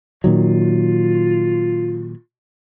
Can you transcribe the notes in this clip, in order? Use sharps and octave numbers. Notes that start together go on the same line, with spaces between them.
A#2 D#3 F#3 F4